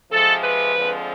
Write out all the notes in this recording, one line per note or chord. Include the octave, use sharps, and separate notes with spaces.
C3 F3 G#3 A4
B4
D3 F3 G#3 C4